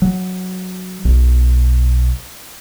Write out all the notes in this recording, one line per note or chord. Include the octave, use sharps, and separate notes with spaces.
F#3
B1